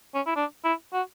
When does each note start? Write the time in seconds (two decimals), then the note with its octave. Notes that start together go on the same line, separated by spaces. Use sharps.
0.14 C#4
0.26 E4
0.36 D4
0.64 E4
0.93 F#4